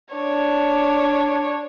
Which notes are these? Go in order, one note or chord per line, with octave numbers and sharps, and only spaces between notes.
D4 C#5